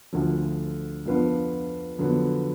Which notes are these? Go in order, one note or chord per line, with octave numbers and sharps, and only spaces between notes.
D2 D3 F3
F2 F3 B3 D4 F4
F2 D3 F#3 B3